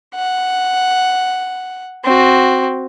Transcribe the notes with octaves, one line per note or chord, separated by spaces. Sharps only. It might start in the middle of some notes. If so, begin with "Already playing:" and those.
F#5
C4 F#4